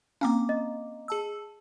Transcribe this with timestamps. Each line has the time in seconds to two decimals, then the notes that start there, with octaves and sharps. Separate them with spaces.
0.21 A#3 C4 C#4 F5 A#5 D6
0.49 D#5
1.08 G#4 A5 E6